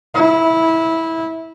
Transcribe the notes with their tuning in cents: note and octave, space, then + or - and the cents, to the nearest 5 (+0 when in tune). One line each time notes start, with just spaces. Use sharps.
E4 -15